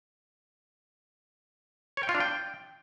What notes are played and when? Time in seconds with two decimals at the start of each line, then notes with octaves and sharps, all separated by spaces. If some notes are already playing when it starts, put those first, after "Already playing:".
1.97 C#5
2.03 G5
2.09 F4
2.15 D4
2.20 G5